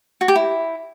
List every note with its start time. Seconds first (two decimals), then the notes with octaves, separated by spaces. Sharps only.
0.21 F#4
0.28 G4
0.36 E4